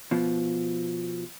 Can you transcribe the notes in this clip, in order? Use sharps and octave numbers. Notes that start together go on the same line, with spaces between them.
B2 F3